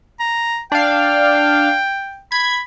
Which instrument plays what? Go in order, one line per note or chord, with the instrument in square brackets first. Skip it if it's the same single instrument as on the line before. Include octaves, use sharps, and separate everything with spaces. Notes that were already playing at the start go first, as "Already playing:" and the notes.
[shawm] A#5
[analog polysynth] D4 F5 [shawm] G5
[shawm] B5 [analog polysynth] G#6